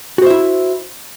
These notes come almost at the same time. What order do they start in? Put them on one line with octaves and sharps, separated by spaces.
F#4 C5 E5 E4